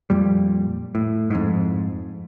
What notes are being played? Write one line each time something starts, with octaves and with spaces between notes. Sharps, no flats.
F2 A#2 G3
A2
F2 G#2